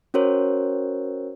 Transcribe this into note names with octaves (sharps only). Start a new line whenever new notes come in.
C#4 F#4 A#4 C5 C#5